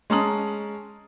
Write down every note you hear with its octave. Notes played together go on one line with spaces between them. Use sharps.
G#3 C#4 A5 A#5 D#6 F#7